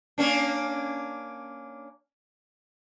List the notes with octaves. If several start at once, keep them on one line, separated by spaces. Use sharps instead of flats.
A#3 C#4 D4